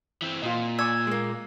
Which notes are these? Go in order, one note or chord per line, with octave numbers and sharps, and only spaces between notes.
E3 C4
A#2 F4 D#5
D5 G#5 C#6 E6 G#6
G#3 A#3